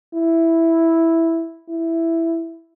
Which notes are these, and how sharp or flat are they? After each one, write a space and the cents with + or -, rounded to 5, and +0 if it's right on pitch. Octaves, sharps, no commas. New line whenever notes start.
E4 +0
E4 +5